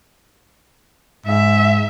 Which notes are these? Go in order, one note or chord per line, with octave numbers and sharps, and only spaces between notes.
G#2 E5